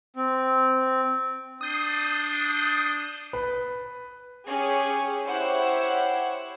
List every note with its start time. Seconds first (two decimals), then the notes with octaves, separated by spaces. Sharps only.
0.16 C4
1.61 D4 D#6 G6 C7
3.33 B4
4.48 C#4 G4 G#4
5.26 E4 G4 C5 C#5 F#5 E6